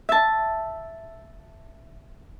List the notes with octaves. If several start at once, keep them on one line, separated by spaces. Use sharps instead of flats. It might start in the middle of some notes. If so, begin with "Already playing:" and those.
E5 A5